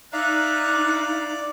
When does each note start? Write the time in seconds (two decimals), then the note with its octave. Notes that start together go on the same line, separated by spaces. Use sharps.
0.13 D#4 D5 E5 F5 A#5 F#6